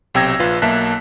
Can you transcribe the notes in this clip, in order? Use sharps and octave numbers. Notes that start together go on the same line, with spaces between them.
B1 C3 G5 E6 G#6 A#6
A#1 F4 B4
B1 A#3 E5 A5 F#6 B6